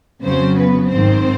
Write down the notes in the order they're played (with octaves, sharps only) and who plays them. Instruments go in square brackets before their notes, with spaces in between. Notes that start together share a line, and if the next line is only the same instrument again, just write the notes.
[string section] F2 C#3 F#3 C4 C5
B3 B4
G#1 G#2 D#3 C4 C5